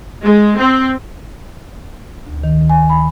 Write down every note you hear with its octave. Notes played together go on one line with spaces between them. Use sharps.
G#3
C4
D2
D#3
G#5
B5